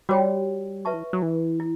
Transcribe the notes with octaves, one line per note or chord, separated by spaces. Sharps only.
G3 F#4 C#5 G5
F#3 B4 E5 A5 C#6
E3
F#3
E3
E4